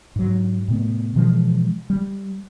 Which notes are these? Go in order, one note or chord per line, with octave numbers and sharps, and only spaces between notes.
G#2 F#3
A2 C3 A3 B3
B2 E3 F3 G#3
G3